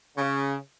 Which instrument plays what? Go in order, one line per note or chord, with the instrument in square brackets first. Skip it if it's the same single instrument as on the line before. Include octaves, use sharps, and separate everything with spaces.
[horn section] C#3